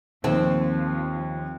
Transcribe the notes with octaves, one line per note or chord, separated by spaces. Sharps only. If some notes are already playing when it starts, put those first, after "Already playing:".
D#2 F3 C4